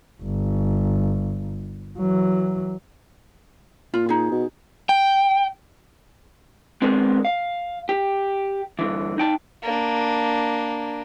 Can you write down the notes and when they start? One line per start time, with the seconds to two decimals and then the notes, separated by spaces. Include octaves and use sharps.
0.23 G1
1.99 E3 F#3
3.94 A#2 F4
4.09 D#4 G#4
4.31 B2
4.89 G5
6.82 G#3 B3 C4 D4 G#4 A#4
7.25 F5
7.89 G4
8.79 G2 D3 E3
9.18 D#4 G5 A5
9.63 A#3 D4